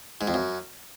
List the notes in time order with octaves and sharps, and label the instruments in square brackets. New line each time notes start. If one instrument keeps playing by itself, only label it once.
[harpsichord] G#2
F2
F#2